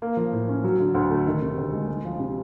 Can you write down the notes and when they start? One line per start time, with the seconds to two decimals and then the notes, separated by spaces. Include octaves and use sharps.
0.02 A#3
0.17 F3
0.33 A2
0.49 C#4
0.64 F#3
0.80 D3
0.94 D2
1.10 A3
1.27 D#3
1.42 C3
1.58 D2
1.72 G#3
1.88 G#3
2.04 F3
2.19 C3